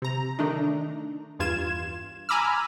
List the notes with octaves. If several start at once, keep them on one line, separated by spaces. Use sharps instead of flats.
C3 A#5
D#3 A3 D4 D#4
E2 G2 F4 G#6 E7
G#5 A#5 B5 D6 E6 F6